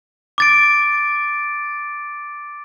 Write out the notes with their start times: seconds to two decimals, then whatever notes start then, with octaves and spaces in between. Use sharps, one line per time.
0.38 D6 A6 D7